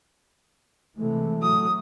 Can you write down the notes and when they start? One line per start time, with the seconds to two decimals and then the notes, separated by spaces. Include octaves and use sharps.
0.97 C3 E3 G#3 A3
1.42 A2 F#3 D#6